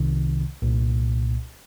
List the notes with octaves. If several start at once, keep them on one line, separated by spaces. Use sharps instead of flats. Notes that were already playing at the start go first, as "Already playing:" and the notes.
Already playing: C2 C3 D#3
C2 A#2